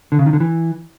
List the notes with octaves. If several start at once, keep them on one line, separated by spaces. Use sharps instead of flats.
D3
C#3
D#3
D3
E3